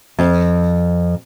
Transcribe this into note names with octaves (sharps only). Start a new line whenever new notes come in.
F2